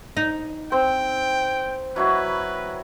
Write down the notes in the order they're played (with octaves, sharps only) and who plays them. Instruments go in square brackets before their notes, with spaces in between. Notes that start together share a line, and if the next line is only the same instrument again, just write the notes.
[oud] D#4
[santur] C4 [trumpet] G5
[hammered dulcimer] F#3 E4 F#4 [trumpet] B4